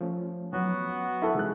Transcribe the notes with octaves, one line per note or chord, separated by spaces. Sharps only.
F3 A3 C#4
F#3 B3 F#4
E4 A4 B5 C#6
C3 E3 G#3 D#4 F#6